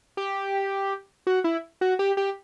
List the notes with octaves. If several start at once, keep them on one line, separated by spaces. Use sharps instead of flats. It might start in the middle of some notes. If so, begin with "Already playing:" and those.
G4
F#4
E4
F#4
G4
G4